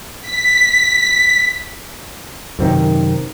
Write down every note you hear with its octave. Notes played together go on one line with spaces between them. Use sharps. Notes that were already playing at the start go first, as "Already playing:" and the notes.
B6
F#2 C3 D#3